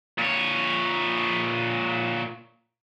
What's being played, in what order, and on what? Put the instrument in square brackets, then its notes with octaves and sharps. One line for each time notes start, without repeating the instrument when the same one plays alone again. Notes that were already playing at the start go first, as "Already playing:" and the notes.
[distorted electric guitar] A#2 C#5